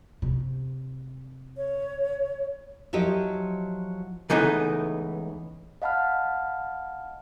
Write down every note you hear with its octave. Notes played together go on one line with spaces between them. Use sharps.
C3
C#5
F3 F#3 E4 G4 D#5
C#2 E3 A3 B3 D#4
D#5 F5 F#5 A5 B5 F6